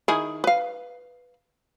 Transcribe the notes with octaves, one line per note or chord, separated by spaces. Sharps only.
D#3 E4 G#4
B4 F5